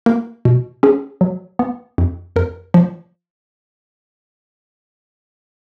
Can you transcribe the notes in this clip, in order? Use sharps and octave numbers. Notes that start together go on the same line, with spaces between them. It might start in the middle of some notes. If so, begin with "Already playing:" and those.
A#3 A#4
B2
C#4 G#4
F#3
B3
F2
F2 A#4
F3